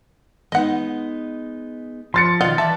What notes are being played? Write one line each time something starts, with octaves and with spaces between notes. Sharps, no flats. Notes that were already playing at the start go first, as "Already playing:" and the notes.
G#3 B3 D#4 D#5 F#5
F3 C6 A6 C#7
B2 D#3 F4 D5 D#5 F#5
E3 G3 B3 D5 E5 A5